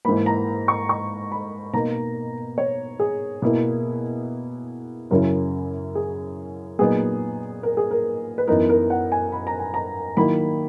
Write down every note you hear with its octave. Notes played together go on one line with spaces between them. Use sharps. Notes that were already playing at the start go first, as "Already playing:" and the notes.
G#2 E3 A#3 B5
A#5
C#6
C#6
B5
B2 A#3 D#4 A#5
C#5
G#4
B2 A#3 E4
F#2 C#3 F#3 C#4 E4 A#4
G#4
A#2 F#3 B3 D#4 G#4
A#4
G#4
A#4
B4
F#2 E3 B3 D#4 A#4
A#4
F#5
G#5
B5
A#5
G#5
A#5
D#3 F#3 A#3 E4 B5